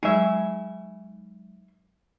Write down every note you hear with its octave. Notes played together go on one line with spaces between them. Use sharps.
F#3 G#3 D#4 G#4 E5